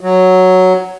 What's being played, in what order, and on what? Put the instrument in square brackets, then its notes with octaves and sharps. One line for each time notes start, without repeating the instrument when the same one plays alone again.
[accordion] F#3